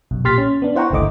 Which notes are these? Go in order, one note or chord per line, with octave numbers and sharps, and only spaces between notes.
B1 F#2 B2
A#2 G4 C6 F6 A6 B6
C#4
B3 D4
E4 C5 F#5 G5 A#5 C#6
G1 C#2 D3 A3 D#5 D6